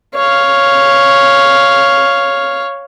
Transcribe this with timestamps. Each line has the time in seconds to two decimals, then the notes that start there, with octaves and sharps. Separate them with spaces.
0.15 C#5 F5